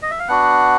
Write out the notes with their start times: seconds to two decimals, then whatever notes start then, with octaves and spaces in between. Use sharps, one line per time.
0.02 D#5
0.11 E5
0.19 F5
0.28 B3 D4 F#4 F#5